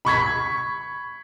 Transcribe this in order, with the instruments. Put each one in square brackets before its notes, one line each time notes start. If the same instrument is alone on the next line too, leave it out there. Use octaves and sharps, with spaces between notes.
[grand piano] B5 C#6 G#6 B6